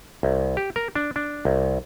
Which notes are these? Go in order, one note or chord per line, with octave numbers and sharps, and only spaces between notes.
C2
G4
A#4
D4
D4
C2